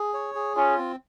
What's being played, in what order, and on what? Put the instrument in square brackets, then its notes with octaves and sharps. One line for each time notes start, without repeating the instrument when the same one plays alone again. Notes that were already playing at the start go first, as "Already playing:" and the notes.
Already playing: [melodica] G#4
C#5
G#4
[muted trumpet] C#4 [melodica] F4
[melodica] C4